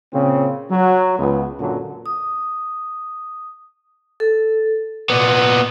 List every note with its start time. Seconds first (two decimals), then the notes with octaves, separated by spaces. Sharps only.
0.13 A#2 C#3 C4
0.70 F#3
1.19 C#2 B3
1.60 F#2 A#2 D3 F#3
2.06 D#6
4.20 A4
5.10 A#2 B3